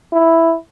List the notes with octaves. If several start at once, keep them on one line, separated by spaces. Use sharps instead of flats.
E4